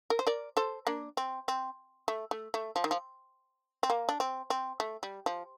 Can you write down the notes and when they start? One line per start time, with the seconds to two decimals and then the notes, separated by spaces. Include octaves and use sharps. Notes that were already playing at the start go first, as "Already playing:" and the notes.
0.10 A#4
0.19 C5
0.27 A#4 D5
0.57 A4 C5
0.87 A#3 D4
1.17 C4
1.48 C4
2.08 A3
2.31 A3
2.54 A3
2.76 F3
2.84 D#3
2.91 F3
3.83 C4
3.90 A#3
4.09 D4
4.20 C4
4.50 C4
4.80 A3
5.03 G3
5.26 F3